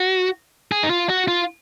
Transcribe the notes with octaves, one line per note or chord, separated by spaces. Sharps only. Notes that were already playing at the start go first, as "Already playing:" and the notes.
Already playing: F#4
G#4
D#4
F4
F#4
F4